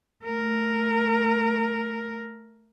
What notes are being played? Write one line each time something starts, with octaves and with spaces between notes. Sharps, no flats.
A3 A#4